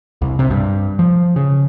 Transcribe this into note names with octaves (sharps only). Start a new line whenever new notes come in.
C2
C3
G2
F3
C#3